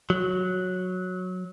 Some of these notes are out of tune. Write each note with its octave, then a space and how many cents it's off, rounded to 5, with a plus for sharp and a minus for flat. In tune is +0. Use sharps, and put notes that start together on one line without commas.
F#3 -10